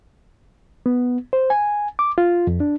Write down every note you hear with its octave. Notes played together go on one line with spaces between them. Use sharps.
B3
C5
G#5
D6
F4
F2
D4